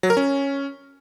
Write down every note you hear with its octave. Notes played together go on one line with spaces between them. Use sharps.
F#3
A#4
C#4